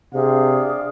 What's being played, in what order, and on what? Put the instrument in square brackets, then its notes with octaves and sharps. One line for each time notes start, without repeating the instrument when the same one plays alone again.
[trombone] C3 [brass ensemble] D4 D5 F5 [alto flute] G#4